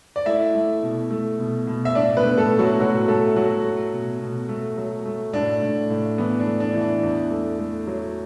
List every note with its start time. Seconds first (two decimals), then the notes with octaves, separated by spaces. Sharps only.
0.16 D5
0.26 A3 E4 E5
0.55 A3
0.83 B2
1.11 A3
1.39 B2
1.67 B2
1.85 E5
1.95 A2 D4 D5
2.17 B3 B4
2.24 A2
2.37 A3 A4
2.51 A2
2.59 F#3 F#4
2.80 A2 F#3 F#4
3.08 A2 A3 A4
3.36 F#3 A3 F#4
3.64 A3
3.93 B2
4.21 B2
4.49 A3
4.77 F#3
5.06 A3
5.33 A2 D4
5.62 A2
5.90 A2
6.18 E3 B3
6.39 D4
6.46 A3
6.60 D4
6.74 E3
6.81 D4
7.03 E2
7.31 A3
7.59 A3
7.87 F#3